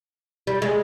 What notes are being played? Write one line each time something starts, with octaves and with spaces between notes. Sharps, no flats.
G3
G#3